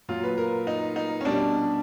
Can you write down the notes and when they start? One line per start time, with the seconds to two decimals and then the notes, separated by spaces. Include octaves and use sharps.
0.09 A#2 F#3 F4
0.24 B4
0.38 A#4
0.67 D#4
0.96 D#4
1.21 C#4
1.25 B2 G3 D4